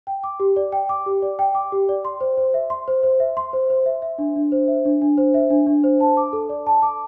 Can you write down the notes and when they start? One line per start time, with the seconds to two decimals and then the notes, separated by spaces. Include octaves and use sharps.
0.07 G5
0.24 D6
0.40 G4
0.56 D5
0.72 G5
0.89 D6
1.06 G4
1.22 D5
1.39 G5
1.55 D6
1.72 G4
1.89 D5
2.05 C6
2.21 C5
2.37 C5
2.54 E5
2.70 C6
2.88 C5
3.03 C5
3.20 E5
3.37 C6
3.53 C5
3.70 C5
3.86 E5
4.02 E5
4.18 D4
4.36 D4
4.52 C5
4.68 E5
4.85 D4
5.02 D4
5.18 C5
5.34 E5
5.50 D4
5.67 D4
5.84 C5
6.00 A5
6.17 D6
6.33 A4
6.49 D5
6.67 A5
6.82 D6